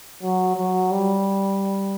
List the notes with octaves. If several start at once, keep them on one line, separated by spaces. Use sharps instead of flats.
F#3
F#3
G3